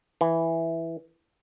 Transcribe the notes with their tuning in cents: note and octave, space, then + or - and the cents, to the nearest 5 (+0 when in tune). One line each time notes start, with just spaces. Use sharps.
E3 +0